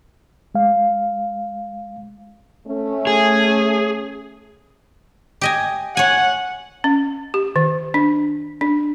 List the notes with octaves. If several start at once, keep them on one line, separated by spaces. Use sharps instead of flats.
G#3 F5
A3 C#4
G#4
G4 D#5 G#5
C#5 F#5 G#5
C#4
G4
D#3
D4
D4